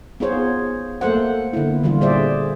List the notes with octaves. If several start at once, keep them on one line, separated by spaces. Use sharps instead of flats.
B3 D#4 F4 G#4 C5 C#5
A3 A#3 A4 C5 F#5
D3 A#3 B3 E4
D3 E3 G3 F4
A#2 G3 G#4 C5 D5 E5